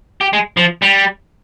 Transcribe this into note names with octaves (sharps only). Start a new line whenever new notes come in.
G4
G#3
F3
G3